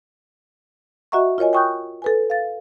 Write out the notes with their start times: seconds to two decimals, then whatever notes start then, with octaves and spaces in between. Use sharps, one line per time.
1.12 F#4 D#5 E5 F#5 A#5 C#6
1.38 F4 A#4 C#5 D#5 G#5
1.53 G5 G#5 C#6 D#6 F#6 G6
2.02 A4 B4 G#5
2.30 F5 A6